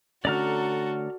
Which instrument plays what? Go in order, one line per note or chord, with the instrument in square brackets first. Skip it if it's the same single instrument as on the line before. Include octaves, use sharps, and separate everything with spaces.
[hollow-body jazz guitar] D3 A3 C#4 [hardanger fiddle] F#4 A4 [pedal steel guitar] D5 A#5 F6